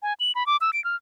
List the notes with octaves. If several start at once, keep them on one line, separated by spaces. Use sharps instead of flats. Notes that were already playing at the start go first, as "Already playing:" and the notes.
G#5
F#7
B5
D6
E6
D7
F6